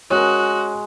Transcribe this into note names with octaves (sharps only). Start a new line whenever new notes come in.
G#3 C#4 F#4 A#4